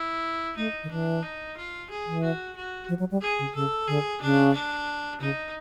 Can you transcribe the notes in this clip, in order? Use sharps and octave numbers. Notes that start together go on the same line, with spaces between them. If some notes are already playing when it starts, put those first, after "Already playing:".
Already playing: E4
A3 D#4
D#3
E3 D4
D#4
F4
G#4
E3
F#4
F#4
F3
F#3
G3
G#4
C#3
C#3 A4
D3 G#4
C#3 D4
D4
C#3 D#4